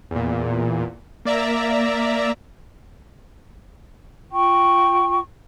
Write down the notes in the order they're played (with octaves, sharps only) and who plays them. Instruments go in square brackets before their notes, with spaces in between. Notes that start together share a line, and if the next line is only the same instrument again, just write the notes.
[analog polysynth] E2 A#2
A#3 D5 E5 A#5
[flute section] F4 G5 C#6